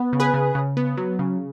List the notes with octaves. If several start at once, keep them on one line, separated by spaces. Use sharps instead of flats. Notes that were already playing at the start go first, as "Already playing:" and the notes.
Already playing: B3
C#3
G#4 B4
C#3
C#3
B3
F#3
C#3